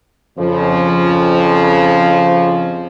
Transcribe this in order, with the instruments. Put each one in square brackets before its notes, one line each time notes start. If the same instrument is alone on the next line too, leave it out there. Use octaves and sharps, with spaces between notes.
[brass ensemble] F2 C#3 F3